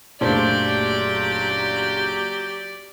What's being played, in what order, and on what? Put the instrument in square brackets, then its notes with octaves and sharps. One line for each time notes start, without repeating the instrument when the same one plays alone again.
[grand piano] F#1 D4 [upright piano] A#2 A3 C5 [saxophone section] F#3 G4 [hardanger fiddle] D5